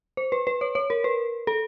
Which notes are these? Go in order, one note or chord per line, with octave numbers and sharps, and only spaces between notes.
C5
B4
B4
C#5
C#5
A#4
B4
A4